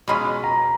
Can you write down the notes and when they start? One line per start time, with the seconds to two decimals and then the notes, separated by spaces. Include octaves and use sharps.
0.08 B2 G#3 C#4 F4 B5
0.44 A#5